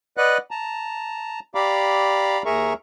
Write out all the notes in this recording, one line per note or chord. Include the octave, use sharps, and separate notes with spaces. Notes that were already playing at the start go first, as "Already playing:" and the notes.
B4 D5 D#5 F#5 F#6
A5 A#5
G4 D5 F5 A#5 B5 D6
D#2 G#4 A#4 E5 A#5 C#6